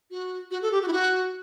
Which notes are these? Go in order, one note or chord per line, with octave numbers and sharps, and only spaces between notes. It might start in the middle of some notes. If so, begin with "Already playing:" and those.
F#4
F#4
A4
G4
F#4
E4
F#4